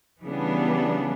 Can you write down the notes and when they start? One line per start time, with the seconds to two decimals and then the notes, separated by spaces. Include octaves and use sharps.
0.22 C#3 E3 G3 B3 D4